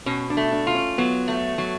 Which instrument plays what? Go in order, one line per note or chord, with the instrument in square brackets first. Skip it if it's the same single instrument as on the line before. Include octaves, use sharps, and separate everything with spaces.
[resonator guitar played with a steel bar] B2 [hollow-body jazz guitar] C#4
[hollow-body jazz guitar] D4
[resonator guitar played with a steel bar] A3
[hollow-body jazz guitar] D4
[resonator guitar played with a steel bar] F4
[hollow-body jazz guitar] C#4
[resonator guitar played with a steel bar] F#3 [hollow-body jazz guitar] B3
[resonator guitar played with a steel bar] A3
F#3